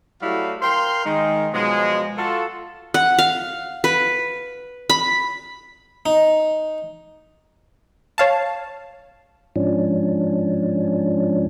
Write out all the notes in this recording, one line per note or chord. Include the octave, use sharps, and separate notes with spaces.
F#3 G3 A3 E4 F#4 F5
A#4 F5 G5 C6
D#3 G#3 D#4
B2 F3 F#3 G#3
F4 F#4 A4
F#5
F5
B4
B5
D#4
C#5 F5 A5
G#2 F3 C#4 D4